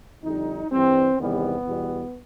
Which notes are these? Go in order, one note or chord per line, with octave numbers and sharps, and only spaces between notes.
F2 D3 G3 D#4
G2 E3 G3 C4
E2 C3 D#3 G3 B3
E2 B2 G3